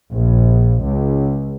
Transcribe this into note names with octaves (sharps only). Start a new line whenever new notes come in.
A#1
C#2